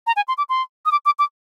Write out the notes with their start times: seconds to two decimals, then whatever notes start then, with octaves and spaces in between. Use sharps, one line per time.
0.07 A#5
0.16 G#5
0.28 C6
0.38 D6
0.49 C6
0.86 D#6
0.92 D6
1.05 D6
1.19 D6